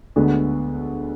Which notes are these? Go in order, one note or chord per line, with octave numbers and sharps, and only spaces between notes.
D2 D3 G#3 B3